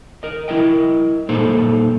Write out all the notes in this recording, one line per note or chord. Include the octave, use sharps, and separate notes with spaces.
A#4 D#5
E4 A#4 D#5 G5
A#2 A#3 D#4 A4 C5 A#5